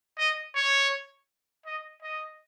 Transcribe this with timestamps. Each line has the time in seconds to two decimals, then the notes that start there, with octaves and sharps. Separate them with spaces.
0.19 D#5
0.55 C#5
1.66 D#5
2.03 D#5